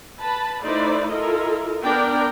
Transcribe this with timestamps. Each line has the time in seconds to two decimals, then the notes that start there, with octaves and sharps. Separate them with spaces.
0.20 B4 A5 B5
0.64 A3 D#4 E4 B4 C5 D5
1.10 E4 F4 A4 A#4 D#5
1.84 B3 D4 A#4 D5 G5